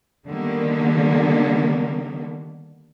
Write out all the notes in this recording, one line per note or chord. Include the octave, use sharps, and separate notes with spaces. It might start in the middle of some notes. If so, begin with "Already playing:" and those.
D3 D#3 G3 A#3 B3